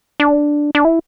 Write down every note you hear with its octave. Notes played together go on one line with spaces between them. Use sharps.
D4
D4
E4